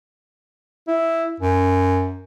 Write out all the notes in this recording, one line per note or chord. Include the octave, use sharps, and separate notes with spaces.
E4
F#2